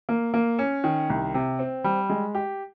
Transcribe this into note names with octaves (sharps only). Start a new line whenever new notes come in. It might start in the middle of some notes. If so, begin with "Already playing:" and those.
A#3
A#3
C#4
D#3
C2
C3
C4
G3
G#3
G4